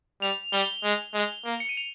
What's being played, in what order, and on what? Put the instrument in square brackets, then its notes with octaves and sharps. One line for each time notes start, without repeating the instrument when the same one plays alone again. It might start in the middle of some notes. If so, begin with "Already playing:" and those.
[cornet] G3 [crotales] F7
[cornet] G3 [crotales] G7
[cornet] G#3
G#3
A#3
[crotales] C#7
D#7
F7